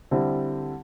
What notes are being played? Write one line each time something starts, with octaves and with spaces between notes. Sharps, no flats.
D3 G3 C4 E4